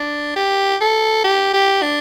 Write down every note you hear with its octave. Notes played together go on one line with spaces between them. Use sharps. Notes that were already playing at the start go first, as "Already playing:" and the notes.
Already playing: D4
G4
A4
G4
G4
D4